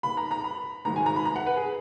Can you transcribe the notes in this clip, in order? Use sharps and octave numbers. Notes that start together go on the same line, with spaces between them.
D#2 D#3 B5
A#5
A#5
B5
G#1 G#2 D#3 A#5
G#5
A#5
B5
A#5
F#5
B4
G#4